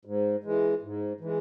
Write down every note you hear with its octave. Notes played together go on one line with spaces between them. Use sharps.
G#2
E3 G#3
G#2
E3 G#3